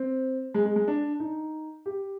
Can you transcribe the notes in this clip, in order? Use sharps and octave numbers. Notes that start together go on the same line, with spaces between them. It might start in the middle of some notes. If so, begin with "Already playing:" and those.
Already playing: C4
G#3
G#3
G#3
D4
D#4
G4